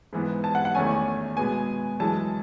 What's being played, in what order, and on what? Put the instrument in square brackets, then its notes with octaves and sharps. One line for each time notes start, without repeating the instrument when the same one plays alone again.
[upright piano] G#2 E3 B3
A5
F#5
F#5
E2 D#3 A3 C#4 G#5
B2 G#3 B3 G#5
F#2 E3 G#3 A5